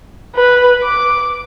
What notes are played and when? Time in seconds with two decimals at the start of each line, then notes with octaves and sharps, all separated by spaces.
0.36 B4
0.83 D6